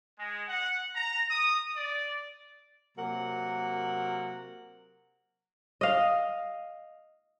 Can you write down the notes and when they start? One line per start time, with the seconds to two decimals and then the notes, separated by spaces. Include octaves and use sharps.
0.19 G#3
0.48 F#5
0.95 A#5
1.31 D#6
1.77 D5
2.97 C3 F#3 A#3 A#4 F#5
5.81 D#5 F5